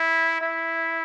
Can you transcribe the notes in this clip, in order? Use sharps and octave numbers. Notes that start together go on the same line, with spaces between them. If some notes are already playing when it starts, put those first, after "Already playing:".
Already playing: E4
E4